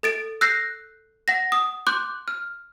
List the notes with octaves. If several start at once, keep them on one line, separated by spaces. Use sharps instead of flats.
A4 A6 D7
E6 F#6 G6 A#6 C7
F#5 A#6
D#6
C6 D6 F#6 G6
F6